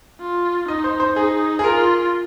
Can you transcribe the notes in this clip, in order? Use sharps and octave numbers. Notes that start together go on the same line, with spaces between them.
F4
D#4 D#5
C5
C5
D#4 G#4
G#4
F4 A#4